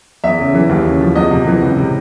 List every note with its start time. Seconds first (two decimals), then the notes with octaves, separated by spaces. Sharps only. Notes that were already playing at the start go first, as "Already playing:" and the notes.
0.24 E2 E5
0.39 C#3
0.54 E3
0.69 D#2
0.85 C#3
1.01 F3
1.16 E2 D#5
1.31 C3
1.47 E3
1.62 C#2
1.77 C3